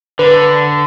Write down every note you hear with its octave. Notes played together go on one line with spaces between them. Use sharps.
D3 B4